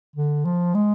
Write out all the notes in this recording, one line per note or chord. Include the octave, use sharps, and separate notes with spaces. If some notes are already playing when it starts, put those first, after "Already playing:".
D3
F3
G#3